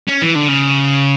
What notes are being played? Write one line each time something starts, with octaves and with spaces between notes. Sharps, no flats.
C#4
E3
D3
C#3